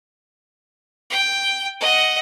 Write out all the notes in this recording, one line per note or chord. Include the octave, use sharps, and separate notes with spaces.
G5
D#5 F#5